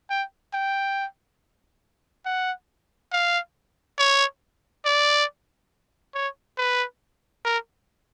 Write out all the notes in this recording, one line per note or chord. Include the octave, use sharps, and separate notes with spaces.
G5
G5
F#5
F5
C#5
D5
C#5
B4
A#4